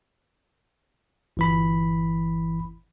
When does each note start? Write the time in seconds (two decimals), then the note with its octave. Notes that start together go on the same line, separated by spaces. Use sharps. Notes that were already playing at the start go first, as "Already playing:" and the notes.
1.37 G1 E3 B5